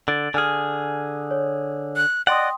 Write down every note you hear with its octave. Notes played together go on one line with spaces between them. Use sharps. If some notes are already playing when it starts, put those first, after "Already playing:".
D3 A6 D7 F#7
D3 G#4 G#5 F6
C#5
F#6
D5 D#5 F#5 G5 C6 D#6